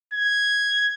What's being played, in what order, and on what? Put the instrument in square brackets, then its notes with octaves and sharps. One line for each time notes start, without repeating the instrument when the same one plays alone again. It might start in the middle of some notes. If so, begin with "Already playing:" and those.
[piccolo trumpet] G#6